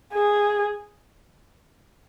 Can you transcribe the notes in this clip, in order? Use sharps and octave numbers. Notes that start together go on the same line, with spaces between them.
G#4